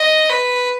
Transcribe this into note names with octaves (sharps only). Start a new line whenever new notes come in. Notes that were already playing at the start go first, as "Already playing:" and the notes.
Already playing: D#5
B4